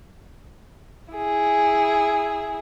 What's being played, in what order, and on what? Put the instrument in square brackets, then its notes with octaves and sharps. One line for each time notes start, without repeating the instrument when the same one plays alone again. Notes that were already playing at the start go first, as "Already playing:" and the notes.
[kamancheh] E4 G#4